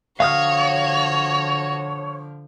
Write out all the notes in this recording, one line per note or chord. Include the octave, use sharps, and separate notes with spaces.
D3 F3 F#4 C#5 F5 D#6 F6